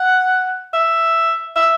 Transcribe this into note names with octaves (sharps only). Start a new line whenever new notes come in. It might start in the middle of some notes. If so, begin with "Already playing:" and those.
Already playing: F#5
E5
E5